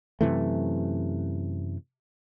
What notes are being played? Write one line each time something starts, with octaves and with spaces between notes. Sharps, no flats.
F#2 C3 E3 A3